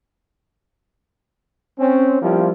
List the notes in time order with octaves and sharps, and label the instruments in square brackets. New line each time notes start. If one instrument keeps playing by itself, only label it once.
[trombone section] C4 C#4
F3 G3 A#3 E4 F4 G4